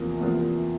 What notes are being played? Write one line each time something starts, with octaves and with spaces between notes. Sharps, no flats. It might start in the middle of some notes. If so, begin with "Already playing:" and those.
Already playing: E2 C3 F3 A#3
E2 C3 F3 A#3